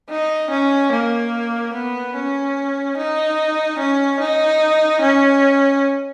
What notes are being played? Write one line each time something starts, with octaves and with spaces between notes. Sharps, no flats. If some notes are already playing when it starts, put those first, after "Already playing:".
D#4
C#4
A#3
B3
C#4
D#4
C#4
D#4
C#4